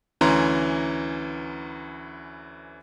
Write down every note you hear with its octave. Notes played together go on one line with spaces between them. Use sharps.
D2 E3 C#4 A#5 C6